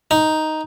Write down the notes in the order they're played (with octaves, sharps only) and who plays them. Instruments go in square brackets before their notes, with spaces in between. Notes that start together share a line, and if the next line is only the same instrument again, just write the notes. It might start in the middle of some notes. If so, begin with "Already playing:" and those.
[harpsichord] D#4